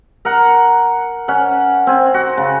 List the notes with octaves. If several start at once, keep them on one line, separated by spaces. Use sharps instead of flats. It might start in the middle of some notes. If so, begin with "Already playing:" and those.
A#4 F#5
C#4 F#5
C4 G#5
F#4
C#3